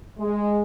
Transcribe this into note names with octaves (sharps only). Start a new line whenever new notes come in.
G#3